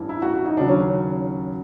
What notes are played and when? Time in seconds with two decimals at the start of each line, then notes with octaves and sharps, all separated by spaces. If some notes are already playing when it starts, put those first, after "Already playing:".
Already playing: A1 G2 E3
0.09 E4
0.22 F#4
0.34 F#4
0.46 D#4
0.57 D#2 C#3 F#3 D4
0.69 C#4